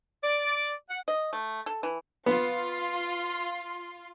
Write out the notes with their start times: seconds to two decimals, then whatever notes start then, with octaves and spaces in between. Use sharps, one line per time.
0.23 D5
0.89 F#5
1.08 D#5
1.33 A3
1.66 A4
1.83 E3
2.26 B3 F4 C6